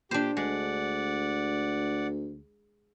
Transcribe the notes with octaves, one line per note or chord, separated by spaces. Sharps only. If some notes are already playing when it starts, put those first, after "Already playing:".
A#2 D4 G4 C5
D2 G#3 D5 F#5